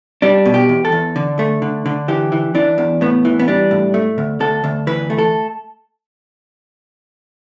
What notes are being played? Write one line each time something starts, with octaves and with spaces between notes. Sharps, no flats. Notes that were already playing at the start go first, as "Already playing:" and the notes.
G3 D4
B2
G4
E2
A4
E2
D3
A3
D3
D3
E3 G4
E3
E3 D4
E2
A2 B3
E3
B3
G3 D4
A2
A3
D2
D2 A4
D2
E3 B4
A3
A4